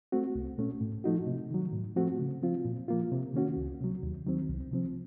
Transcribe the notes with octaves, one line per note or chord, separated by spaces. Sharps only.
A3 C4 F#4
C2
A#2 A3 C#4
A2
F3 A3 D#4 F#4
C3
D#3 F#3
A2
F3 A3 C4 F#4
C#3
F3 C4 F4
A#2
F3 A#3 F4
C3
D#3 A#3 C#4 F#4
C#2
C3 F#3
D#2
D#3 F#3 C4
C2
C3 F3 C4